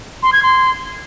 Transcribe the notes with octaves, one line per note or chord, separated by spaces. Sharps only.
C6
G#6
C6